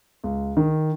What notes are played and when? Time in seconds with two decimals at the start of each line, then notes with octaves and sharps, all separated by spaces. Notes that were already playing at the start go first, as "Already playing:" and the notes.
0.24 C#2
0.57 D#3